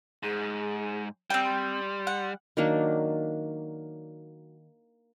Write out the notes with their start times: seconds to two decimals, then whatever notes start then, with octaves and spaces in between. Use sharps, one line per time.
0.23 G#2 G#4
1.30 G3 C4 G5
1.44 C6
2.07 F#5
2.57 D#3 F#3 A#3 D4